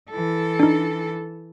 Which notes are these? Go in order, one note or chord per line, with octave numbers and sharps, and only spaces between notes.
E3 A4
D4 D#4